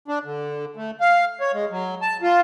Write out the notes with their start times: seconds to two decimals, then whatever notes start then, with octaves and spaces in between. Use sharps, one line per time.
0.08 D4
0.25 D3
0.77 A3
1.00 F5
1.40 C#5
1.53 G#3
1.71 F#3
2.02 A5
2.22 F4